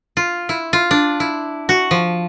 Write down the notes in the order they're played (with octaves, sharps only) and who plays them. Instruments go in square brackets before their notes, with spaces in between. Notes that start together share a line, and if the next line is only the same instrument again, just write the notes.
[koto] F4
E4
F4
D4
E4
F#4
F3